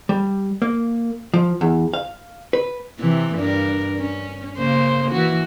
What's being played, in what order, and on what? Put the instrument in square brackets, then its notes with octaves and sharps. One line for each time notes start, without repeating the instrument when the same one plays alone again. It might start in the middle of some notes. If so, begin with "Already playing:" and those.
[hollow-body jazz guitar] G3
A#3
F3
E2
F5
B4
[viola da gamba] C3 E3
G2 D4 A#4
C#4
C#3 A#3 C5
E3 F#4